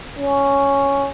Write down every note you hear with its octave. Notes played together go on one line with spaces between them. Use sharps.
C#4